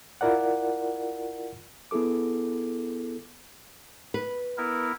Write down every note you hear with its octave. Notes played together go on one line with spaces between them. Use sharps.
E4 F4 A#4 D5 F#5
B3 E4 G#4 A4 D6
B4
B3 E4 A#4